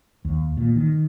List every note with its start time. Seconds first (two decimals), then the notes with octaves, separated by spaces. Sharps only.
0.25 D#2
0.57 A#2
0.76 D#3